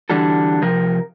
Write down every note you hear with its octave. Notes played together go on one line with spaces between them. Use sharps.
D3 E3 G3 D4 F#4 A4
C3 F3 A#4